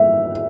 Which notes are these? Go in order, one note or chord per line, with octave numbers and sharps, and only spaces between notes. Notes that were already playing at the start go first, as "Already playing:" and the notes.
Already playing: E5